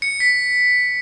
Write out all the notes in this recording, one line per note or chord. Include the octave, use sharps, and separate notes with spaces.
C#7
B6